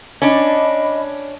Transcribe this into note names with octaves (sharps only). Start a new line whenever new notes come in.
C#4 D4 D#5 B5